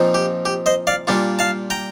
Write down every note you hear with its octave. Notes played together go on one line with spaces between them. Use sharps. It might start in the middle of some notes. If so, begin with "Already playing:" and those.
Already playing: A#2 F3 C4 D#4
G4
G4
C5 D#5
D5 F5
A#2 G3 D4 F4
F5 A5
G5 A#5